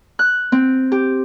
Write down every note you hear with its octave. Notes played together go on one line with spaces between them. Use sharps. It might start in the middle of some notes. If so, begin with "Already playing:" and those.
F#6
C4
G4